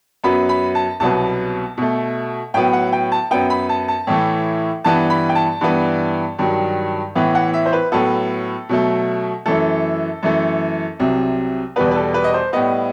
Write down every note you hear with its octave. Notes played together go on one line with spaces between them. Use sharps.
F#2 F#3 B3 B5
B5
A5
C2 B2 F#3 B3 A5
B2 A3
A2 F#3 B3 G5
F#5
G5
A5
F#2 F#3 B3 G5
B5
A5
A5
A2 E3 A3
G2 E3 B3 A5
B5
G5
A5
G2 E3 B3
G2 D#3 F#3
A2 E3 B3
F#5
E5
C5
B4
A2 F#3 B3 A4
B2 F#3 A3
F#2 E3 A3 A4
F#2 E3 A3
C2 C3 F#3
E2 B2 G3 B3 B4
B4
A4
B4
D#5
C5
A2 G3 B3 D#5